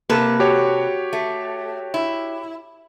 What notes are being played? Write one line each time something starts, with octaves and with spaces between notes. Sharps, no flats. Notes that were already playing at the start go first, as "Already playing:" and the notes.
C3 A#3 A4 B4
F#4 G4 C#5
A3
E4